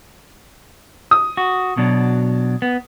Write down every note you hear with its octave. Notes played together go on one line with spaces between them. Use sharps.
D#6
F#4
B2 F#3 D4
B3